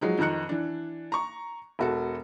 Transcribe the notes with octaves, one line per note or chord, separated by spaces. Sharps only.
F3 F#3 G#3 D#4
F2 D#3 D#4 F#6 C#7
E3 D4
A#5 C#6
E1 F#4 A4